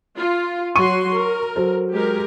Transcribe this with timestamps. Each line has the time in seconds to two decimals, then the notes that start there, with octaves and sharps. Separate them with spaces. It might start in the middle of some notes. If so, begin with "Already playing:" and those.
0.18 F4
0.76 F#3 F#4 C6 C#6 D#7
1.12 A#4
1.56 F#3 A4 C5
1.93 G#3 G4 A#4